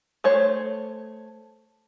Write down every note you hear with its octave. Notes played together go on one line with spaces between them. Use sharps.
A3 C5 C#5